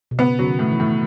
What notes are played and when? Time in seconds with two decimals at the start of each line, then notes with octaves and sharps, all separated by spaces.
0.11 B2
0.18 C#3 B3
0.39 C#3 F#3
0.45 D#3
0.59 A2
0.72 E3
0.80 A2